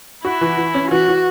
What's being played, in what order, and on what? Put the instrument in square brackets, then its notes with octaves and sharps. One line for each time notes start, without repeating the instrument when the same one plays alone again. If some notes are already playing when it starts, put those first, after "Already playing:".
[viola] E4 [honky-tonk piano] F#4
[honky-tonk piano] E3
E3
C#4
[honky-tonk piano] E3 [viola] F#4
[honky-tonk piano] E3